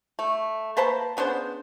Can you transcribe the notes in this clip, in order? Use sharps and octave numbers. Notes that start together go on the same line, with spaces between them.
A3
A#3 B4 C5 A5
C#3 B3 D4 C5